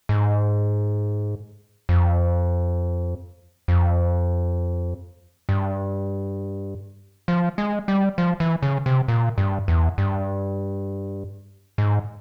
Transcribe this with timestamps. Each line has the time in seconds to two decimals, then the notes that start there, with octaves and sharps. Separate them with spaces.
0.09 G#2
1.89 F2
3.68 F2
5.49 G2
7.28 F3
7.58 G#3
7.88 G3
8.18 F3
8.40 E3
8.63 C#3
8.86 C3
9.08 A#2
9.38 G2
9.68 E2
9.98 G2
11.78 G#2